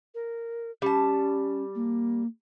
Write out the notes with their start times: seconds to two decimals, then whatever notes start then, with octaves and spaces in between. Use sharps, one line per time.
0.15 A#4
0.82 G3 C#4 A5
1.75 A#3